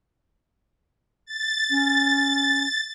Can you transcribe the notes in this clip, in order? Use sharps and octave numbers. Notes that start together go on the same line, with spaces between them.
A6
C#4